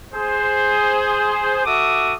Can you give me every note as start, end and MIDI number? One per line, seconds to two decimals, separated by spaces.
0.14 1.65 68
0.14 1.65 72
1.65 2.14 66
1.65 2.14 69
1.65 2.14 76
1.65 2.14 86
1.65 2.14 87